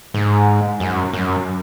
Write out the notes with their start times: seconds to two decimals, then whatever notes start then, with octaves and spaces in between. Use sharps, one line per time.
0.14 G#2
0.80 F#2
1.13 F#2